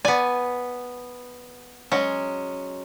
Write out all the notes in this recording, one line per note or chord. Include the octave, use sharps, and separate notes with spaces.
B3 D5 G#5
F#3 G#3 C#4